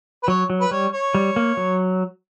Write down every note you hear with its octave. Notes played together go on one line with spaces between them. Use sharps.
B4
F#3 C#5
F#3
B4
G3 C#5
C#5
G3
A#3
F#3